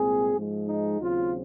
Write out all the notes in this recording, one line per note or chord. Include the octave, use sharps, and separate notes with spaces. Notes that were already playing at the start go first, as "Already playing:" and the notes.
Already playing: C2 A#2 G#3 C4 G#4
G#2 F3 G#3
D#4
D#2 C#3 F#3 C4 F4